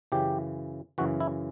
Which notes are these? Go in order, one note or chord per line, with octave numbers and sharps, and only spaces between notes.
F#2 C#3 E3 G4
F#2 C#3 E3 F#4
E4